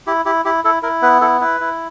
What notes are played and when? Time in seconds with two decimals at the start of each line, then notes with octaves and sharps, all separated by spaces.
0.07 E4 G4
0.25 E4 G4
0.45 E4 G4
0.64 E4 A4
0.83 E4 A#4
1.02 B3 B4
1.21 E4 A4
1.41 E4 B4
1.60 E4